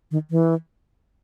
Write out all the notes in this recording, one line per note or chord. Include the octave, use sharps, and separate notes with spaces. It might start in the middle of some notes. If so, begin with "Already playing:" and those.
D#3
E3